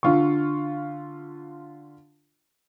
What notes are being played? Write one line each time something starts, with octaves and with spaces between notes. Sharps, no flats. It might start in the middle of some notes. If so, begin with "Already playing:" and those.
D3 F4 C#6